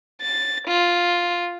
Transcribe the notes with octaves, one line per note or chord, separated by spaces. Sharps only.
A6
F4